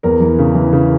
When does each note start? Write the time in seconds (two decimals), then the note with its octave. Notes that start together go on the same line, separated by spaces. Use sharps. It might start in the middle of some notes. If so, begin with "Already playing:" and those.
0.03 E2 A#4
0.20 E3
0.38 C#3
0.55 E3
0.73 C#3